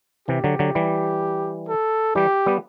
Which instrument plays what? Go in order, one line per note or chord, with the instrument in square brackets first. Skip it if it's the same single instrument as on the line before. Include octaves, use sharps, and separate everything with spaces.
[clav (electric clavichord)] C3 E3 [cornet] G4
[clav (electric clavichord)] D3 F#3
D3 F#3
E3 G3
[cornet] A4
[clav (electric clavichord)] E3 G3 [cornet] G4
[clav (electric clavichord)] G3 B3